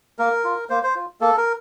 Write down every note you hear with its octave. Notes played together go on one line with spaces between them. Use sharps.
A#3 A#4
F4
A#3 C5
C5
F4
A#3 A4
A#4